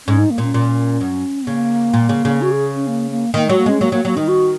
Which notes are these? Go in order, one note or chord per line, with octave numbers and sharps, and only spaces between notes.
G#2 C#4
D#4
A#3
A#2 C#4
A#2
F#2
C#3 A#3
A#2
C#3
C#3
F#4
G#4
C#4
A#3
A#3
D#3 A#3
F#3 G#3
A#3
G#3 C#4
F#3 A#3
F#3 A#3
F#3 A#3
D#3 D#4
F#4